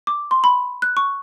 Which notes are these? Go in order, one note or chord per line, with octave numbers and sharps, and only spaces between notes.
D6
C6
B5
F#6
C#6